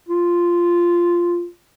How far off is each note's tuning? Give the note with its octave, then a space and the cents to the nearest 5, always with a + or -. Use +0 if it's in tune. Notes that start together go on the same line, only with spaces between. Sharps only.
F4 -5